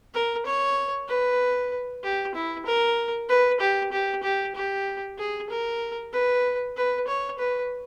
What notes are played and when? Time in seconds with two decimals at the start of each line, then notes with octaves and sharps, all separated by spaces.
0.14 A#4
0.46 C#5
1.08 B4
2.03 G4
2.35 E4
2.66 A#4
3.29 B4
3.61 G4
3.92 G4
4.23 G4
4.55 G4
5.18 G#4
5.50 A#4
6.13 B4
6.77 B4
7.08 C#5
7.39 B4